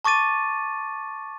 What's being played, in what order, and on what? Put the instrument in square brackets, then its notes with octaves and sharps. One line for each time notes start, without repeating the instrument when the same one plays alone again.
[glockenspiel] A5 C#6 D6 A6 D#7